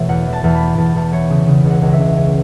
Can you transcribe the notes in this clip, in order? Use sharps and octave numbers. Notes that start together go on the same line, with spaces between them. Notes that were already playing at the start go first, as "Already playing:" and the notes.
Already playing: B2 E3 A3 C#5 E5
E2 F#5
E3
A5
E2
B5
B3
E2 A5
E2
E3 C#5
C#3
C#3
C#2
F#5
C#2
E5
C#2
C#4